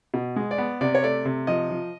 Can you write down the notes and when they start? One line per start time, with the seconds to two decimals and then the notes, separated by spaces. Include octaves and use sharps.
0.14 B2
0.36 G#3
0.51 D5
0.58 B3
0.81 C3 D5
0.95 C#5
1.03 A3 D5
1.25 C3
1.47 F3 D#5
1.70 F3